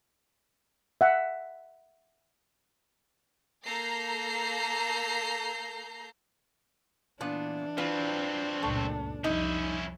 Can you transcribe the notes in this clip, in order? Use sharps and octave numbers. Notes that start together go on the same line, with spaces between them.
E5 F#5
A#3 A4 A#5 G6 C7
A#2 E3 B3 D4
F#3 C4 F4 B4
C#2 F#2 A#2 A3
C2 F2 G3 C#4 D#4 E4